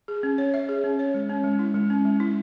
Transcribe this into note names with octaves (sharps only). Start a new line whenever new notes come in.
G#4
C#4
C#5
E5
G#4
C#4
C#5
G#3
C#4
G#3
E4
G#3
C#4
G#3
E4